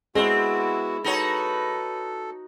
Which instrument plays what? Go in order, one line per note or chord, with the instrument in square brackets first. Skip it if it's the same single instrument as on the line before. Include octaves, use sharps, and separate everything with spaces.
[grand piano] G#3 [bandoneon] B3 F#4 [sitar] C4 [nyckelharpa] E4
[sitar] D#4 F#4 C#5 [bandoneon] A4 [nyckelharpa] B4